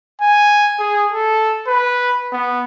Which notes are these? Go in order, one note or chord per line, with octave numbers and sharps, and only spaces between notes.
G#5
G#4
A4
B4
B3